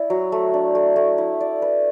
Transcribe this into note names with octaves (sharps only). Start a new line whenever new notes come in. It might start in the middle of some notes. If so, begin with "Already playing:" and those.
Already playing: E4 D5
F#3
A3
D4
A3
A3
E4
D5
B4